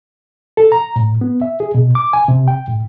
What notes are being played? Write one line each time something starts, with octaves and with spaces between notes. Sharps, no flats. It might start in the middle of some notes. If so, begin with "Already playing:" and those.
A4
A#5
A2
B3
E5
G#4
B2
D6
G#5
C3
G5
A2